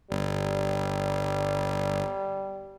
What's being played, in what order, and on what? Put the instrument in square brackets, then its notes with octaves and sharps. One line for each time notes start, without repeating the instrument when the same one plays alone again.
[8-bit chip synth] G1 [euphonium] G3